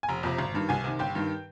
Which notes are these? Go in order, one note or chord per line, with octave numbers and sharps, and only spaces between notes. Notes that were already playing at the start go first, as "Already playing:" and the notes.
G#5
F1 A#5
F2 C3
G#1
G2 D#3
C2 G#5
C3 D#3
G1 G5
G2 D#3